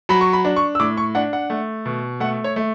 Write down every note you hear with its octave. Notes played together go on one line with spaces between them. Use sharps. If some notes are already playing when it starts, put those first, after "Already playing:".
F#3 B5
C#6
B5
D4
C#6
E6
A2 D6
C#6
D4 F#5
F#5
A3
B2
A3 F#5
C#5
A3